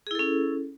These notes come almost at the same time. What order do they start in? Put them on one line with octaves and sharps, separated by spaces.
G#4 E4 A4 C#4